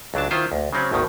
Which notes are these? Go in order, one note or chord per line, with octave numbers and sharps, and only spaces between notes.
C#2 F#3 D4 A5
D#3 E4 F4 C5
D2
C#3 F#3 C4 C#4
G#1 D2 B2 D#3